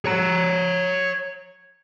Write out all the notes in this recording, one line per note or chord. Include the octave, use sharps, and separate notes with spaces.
C#5 A#5